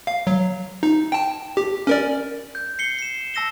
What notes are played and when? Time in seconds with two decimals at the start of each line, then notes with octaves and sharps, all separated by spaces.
0.07 F5
0.27 F#3
0.83 D#4
1.12 G5 A5
1.57 G4
1.87 C#4 A#4 D5
2.55 G6
2.79 C7 C#7 G7
2.99 C7 E7
3.34 A5 E6 A#6 E7 G7